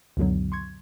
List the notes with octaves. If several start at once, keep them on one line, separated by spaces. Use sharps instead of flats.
C#2 F#2 B2 D3 F#3
C6 C#6 G#6